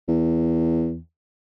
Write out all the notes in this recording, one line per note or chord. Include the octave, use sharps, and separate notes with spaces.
E2